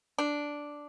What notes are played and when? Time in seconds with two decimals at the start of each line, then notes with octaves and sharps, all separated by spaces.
0.18 D4